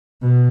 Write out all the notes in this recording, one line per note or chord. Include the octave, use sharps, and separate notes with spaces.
B2